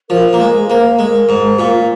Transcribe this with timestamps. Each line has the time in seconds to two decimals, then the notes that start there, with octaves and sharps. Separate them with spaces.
0.09 F3 A#4
0.33 A#3
0.40 G#3 A#4
0.59 G#4
0.69 A#3 C5
0.80 A#4
0.99 G#3
1.29 G#2
1.58 A#2 F4
1.74 F4